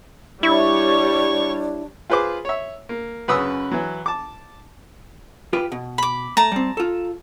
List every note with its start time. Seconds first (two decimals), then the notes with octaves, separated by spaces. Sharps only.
0.43 G3 D4 E4 C#5 C#6
2.10 F4 G#4 B4 C5 D6
2.45 C#5 E5
2.89 A#3
3.28 F#2 C#3 B4 B5 D#6 E6
3.71 E3 F#3
4.06 A5 D6
5.53 F4 G4 B4
5.72 B2
5.98 B5 D6
6.37 A3 A5 A#5
6.52 G3 C4
6.77 F4 A4